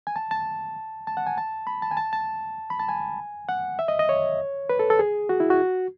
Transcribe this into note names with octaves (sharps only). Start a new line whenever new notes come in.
G#5
A5
A5
A5
F#5
G#5
A5
B5
A5
G#5
A5
A5
B5
A5
G#5
F#5
E5
D#5
D#5
C#5
B4
A4
A4
G#4
F#4
E4
F#4